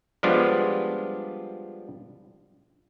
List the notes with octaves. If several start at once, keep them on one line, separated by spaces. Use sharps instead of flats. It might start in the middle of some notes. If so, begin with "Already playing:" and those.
F3 G3 G#3 B3 D4 F4